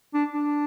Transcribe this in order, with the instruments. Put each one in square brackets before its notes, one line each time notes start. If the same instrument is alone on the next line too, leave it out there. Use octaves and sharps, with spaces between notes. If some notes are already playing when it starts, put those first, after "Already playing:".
[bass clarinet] D4
D4